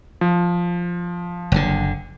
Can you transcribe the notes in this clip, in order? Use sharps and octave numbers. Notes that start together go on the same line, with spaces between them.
F3
F#1 D3